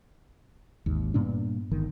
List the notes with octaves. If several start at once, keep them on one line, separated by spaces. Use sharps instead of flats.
G#1 D#2
G2 A#2 B3 D4
G1 D#3